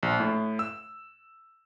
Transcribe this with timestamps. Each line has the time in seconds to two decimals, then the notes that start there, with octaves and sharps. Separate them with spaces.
0.03 A#1
0.20 A2
0.59 E6